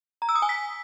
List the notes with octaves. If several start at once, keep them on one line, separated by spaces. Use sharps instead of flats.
A#5
E6
D#6
G#5
B6